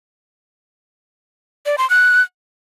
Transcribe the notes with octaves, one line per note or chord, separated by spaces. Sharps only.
D5
C6
F#6